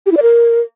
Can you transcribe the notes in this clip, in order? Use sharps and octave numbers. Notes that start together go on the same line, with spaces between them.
G4
E4
D5
A#4